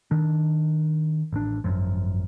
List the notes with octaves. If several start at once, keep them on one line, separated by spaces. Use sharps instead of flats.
D#3 D4
A1 D4
G#1 F#2 F3